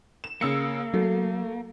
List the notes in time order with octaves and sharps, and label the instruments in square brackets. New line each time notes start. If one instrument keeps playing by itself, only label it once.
[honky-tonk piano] E7
[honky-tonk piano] C#3 E6 C#7 [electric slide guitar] A#3
[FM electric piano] F#3 [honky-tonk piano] A3